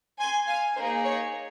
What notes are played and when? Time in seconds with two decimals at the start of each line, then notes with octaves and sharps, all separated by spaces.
0.19 G#5 C6
0.46 F5 G#5
0.75 A#3 D#4 G#4 C5
1.03 C#5